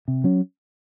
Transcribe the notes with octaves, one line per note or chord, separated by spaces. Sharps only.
C3
F#3 C#4